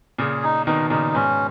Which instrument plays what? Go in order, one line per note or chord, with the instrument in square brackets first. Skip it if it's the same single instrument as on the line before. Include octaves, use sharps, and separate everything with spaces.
[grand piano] A#2 C#3 [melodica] G#4
[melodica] D#4
[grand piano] B2 D#3 [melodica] D#4
[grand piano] A#2 C#3 [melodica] D#4
[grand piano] G#2 B2 [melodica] C#4